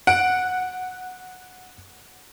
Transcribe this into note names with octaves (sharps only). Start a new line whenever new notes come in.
F#5 D7